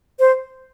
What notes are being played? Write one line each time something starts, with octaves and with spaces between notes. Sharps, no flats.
C5